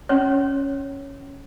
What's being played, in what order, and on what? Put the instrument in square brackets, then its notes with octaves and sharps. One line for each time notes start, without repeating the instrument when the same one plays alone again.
[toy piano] C#4 C#5